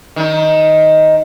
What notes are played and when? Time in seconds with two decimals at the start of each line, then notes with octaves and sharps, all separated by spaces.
0.16 D#3 D#4